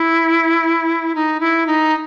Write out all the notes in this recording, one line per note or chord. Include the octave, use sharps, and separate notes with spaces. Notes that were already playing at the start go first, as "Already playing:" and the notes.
Already playing: E4
D#4
E4
D#4